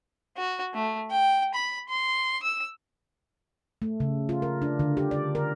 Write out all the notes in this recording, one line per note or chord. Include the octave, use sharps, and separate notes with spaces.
F#4
A3
G5
B5
C6
E6
A3
C#3
F4
A#4
D4
D3
G4
D5
A#4